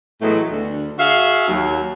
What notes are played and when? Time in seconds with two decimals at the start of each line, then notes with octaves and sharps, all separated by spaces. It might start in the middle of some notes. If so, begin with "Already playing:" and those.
0.22 A2 E3 F#3 G#3 A3 B3
0.51 D2 D3
0.99 F#4 G#4 E5 F5
1.48 D#2 F#3